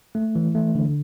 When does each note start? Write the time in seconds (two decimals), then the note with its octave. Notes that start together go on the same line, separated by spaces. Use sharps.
0.15 A3
0.35 E3
0.55 A3
0.75 D3